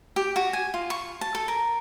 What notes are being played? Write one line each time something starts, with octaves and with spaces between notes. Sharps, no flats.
G4
F#4
G#5
F4
C#6
A5
A4
A#4